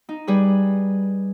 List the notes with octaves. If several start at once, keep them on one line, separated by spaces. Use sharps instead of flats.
D#4
G3 G#4 B4